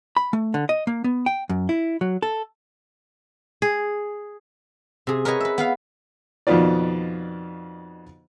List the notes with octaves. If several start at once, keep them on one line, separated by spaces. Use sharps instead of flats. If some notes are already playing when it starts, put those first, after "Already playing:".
B5
A3
D3
D#5
A#3
B3
G5
F#2
E4
F#3
A4
G#4
C3 G#4
A#4 B4 C#5 D#5 G#5
B4 E5
B3 B4 F5
F2 B2 D#3 B3 F4 D5